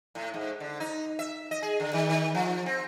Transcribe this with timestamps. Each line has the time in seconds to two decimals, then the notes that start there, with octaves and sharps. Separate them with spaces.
0.15 A2
0.34 G#2
0.60 D3
0.80 D#4
1.19 E5
1.51 D#5
1.62 G#4
1.80 D3
1.93 D#3
2.09 D#3
2.35 F3
2.66 C4